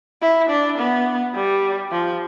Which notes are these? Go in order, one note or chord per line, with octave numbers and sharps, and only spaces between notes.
E4
D4
B3
G3
F3